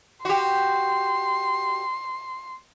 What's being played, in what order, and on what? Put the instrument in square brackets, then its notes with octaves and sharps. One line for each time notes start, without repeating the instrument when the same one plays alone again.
[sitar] F#4 G4 [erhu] C6